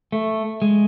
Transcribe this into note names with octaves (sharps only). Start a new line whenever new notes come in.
A3
G#3